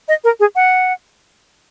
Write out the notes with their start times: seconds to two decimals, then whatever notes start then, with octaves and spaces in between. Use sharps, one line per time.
0.08 D#5
0.24 A#4
0.40 G#4
0.56 F#5